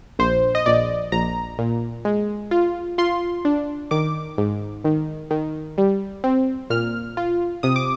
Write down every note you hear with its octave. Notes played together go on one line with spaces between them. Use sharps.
A#1 C5
D#5
A#1 D5
A#1 A#5
A#2
G#3
F4
F4 C6
D4
D#3 D6
G#2
D#3
D#3
G3
C4
A#2 F6
F4
C3 D#6
D6